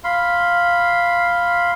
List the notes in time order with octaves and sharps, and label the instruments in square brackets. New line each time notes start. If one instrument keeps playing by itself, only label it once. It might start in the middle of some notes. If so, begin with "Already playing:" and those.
[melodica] F5 B5 C6